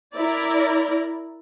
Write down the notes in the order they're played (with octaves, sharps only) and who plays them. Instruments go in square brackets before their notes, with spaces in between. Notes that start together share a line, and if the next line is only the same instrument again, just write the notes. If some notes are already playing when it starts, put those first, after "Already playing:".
[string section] E4 A#4 D5